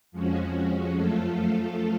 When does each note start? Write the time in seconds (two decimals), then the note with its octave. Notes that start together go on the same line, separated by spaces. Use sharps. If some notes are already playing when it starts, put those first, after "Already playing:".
0.12 F2 F3 G#3 C#4 F#4
0.94 F#2 F3 A3 F4 A4